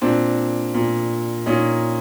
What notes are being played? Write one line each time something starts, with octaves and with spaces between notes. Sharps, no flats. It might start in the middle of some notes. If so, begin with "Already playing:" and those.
A#2 C4 D4
A#2
A#2 C#4 D#4